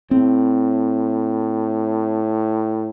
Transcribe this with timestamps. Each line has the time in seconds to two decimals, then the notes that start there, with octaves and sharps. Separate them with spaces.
0.11 A2 C4